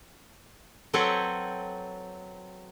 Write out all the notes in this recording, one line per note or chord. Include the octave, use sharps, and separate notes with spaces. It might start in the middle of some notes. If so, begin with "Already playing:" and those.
F#3 C4 A4 B4 C#5 G5